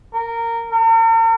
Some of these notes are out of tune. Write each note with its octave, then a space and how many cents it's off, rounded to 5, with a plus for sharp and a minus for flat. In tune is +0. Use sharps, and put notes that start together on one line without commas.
A#4 -15
A#4 -45